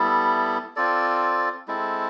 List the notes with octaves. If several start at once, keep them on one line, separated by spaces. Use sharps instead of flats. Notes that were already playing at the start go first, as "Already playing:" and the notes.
Already playing: G3 B3 E4 A4
C4 F4 A4 D5
G#3 C4 E4 A4